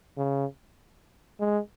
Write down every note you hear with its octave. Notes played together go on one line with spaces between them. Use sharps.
C#3
G#3